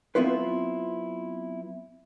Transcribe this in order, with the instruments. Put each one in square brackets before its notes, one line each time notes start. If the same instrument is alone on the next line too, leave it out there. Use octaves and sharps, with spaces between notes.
[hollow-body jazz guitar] F#3 B3 C4 E4 F4 B4